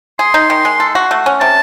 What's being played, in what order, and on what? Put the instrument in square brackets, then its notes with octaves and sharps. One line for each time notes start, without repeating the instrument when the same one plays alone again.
[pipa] G#4 [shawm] C6
[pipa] D#4
D#3
G#3
A4
F#4
A3
C#4
[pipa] C3 [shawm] A5